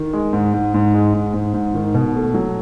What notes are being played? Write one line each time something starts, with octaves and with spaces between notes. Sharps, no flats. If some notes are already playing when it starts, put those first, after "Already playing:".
Already playing: D#3
G#3
G#2
G#2
G#2
G#3
G#2
G#2
G#2
D#3
B2
A3
F#3